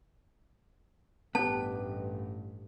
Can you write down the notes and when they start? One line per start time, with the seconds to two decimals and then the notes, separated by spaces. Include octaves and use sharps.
1.35 A1 G2 B3 G4 A5